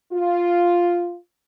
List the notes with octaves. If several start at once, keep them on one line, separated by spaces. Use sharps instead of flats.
F4